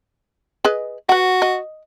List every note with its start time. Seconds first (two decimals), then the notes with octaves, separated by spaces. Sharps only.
0.65 G#4 B4 D#5
1.09 F#4 B4 F#5
1.42 D#5